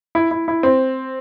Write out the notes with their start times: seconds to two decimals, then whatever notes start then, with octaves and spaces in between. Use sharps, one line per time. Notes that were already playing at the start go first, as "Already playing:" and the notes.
0.15 E4
0.31 E4
0.48 E4
0.63 C4